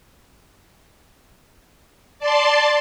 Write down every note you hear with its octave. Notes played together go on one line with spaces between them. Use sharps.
D5 A5 C6